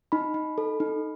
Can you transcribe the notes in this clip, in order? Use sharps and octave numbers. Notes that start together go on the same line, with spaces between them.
D#4 B5
D#4
A4
D#4